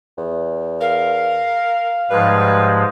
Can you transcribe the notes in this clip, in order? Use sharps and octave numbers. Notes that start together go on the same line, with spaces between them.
E2
A#4 F5
G#2 F3 G3 G#3 B4